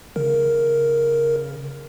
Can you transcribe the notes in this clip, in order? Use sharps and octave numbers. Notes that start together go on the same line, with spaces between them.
C#3 A#4